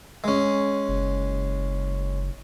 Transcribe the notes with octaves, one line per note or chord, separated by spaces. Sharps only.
G#3 C#4
F#1